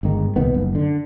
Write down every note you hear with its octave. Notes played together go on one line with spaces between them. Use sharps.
G1 G#2 D#3
D#1 C2 D#3 B3
F#1
D3